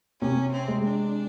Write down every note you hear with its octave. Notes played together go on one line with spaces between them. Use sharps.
C3 C#4
C4
G#3
D4